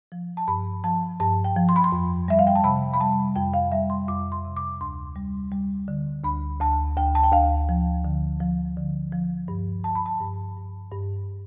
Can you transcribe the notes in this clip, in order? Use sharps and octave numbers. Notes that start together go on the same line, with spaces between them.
F3
A5
G2 B5
F3 A5
G2 A5
G5
F3
C6
B5
C6
F2
G3 E5
F5
G5
A5
C3 B5
B5
G3 A5
F2 G5
F5
G3 E5
C6
F2 D6
C6
C3
D6
D2 C6
G3
G3
D3
D2 B5
D2 A5
D2 G5
A5
G5
D2 F5
F3
D3
F3
D3
F3
G2
G2 A5
B5
A5
G2
G2
G2